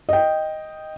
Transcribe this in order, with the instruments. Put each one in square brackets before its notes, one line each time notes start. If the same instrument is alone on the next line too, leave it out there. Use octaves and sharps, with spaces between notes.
[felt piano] D#5 G5